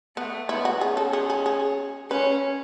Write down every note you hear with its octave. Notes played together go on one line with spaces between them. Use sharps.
A3 B3
B3 E4
F#4
C#4 G#4
A4
G#4
G#4
G#4
C#4 B4